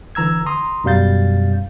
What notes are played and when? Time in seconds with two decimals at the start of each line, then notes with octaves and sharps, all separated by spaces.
0.15 D3 E3 A#5 E6 G#6
0.46 A#5 C6 D#6
0.84 F#2 B2 G3 F5 G6 A6